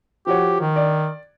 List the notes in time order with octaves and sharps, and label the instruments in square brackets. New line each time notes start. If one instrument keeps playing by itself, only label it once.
[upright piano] F3 F#4 C#5 [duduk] G4
[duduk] D#3
[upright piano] D5